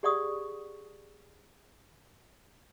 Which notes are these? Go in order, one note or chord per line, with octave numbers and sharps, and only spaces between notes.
G4 G#4 D5 F#5 C#6 D#6